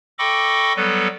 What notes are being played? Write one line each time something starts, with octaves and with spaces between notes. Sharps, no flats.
A4 D#5 G5 B5 C#6 D6
F#3 G3 B3 A4 B4